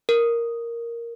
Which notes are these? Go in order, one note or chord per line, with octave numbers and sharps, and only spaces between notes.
A#4